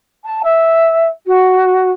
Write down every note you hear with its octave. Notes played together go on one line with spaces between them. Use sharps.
A5
E5
F#4